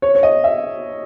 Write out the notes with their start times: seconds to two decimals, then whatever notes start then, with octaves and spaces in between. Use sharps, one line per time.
0.02 C#5
0.15 C#5
0.23 D#5
0.44 E5